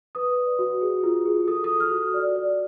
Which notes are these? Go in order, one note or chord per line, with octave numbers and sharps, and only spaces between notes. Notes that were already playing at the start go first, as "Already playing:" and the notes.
B4 D#6
D5
F#4
G#4
F4
G#4
A4 D#6
D#6
F#4
F6
F#4
D5
D5